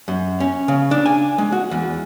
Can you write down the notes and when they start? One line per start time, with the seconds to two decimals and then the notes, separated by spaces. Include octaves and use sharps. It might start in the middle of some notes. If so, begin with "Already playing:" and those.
0.08 F#2
0.40 C#4
0.68 C#3
0.91 D4
1.06 G#5
1.38 G#3
1.52 F#4
1.71 E2